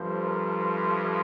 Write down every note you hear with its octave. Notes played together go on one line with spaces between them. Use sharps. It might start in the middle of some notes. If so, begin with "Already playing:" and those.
Already playing: G2 F3 A3 C5
A#4
C5